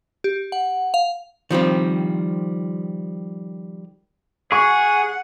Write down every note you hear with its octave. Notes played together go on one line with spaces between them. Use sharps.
G4
F#5
F5
D#3 F3 G3 C4
G#4 F#5 C#6